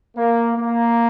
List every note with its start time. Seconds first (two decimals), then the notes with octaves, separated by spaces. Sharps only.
0.17 A#3
0.56 A#3